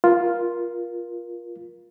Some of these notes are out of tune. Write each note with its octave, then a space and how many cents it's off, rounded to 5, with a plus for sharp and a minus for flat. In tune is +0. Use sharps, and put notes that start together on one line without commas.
F4 +0 A#4 +25